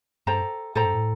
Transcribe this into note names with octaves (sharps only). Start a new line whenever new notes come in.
G2 A4 C5 G5 A#5
A2 A4 C5 G5 A#5
G2
A2